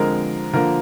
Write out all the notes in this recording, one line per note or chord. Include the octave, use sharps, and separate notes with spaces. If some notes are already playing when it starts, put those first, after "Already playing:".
Already playing: D3 F3 G#3 C4 A#4
D3 F3 A#3 A#4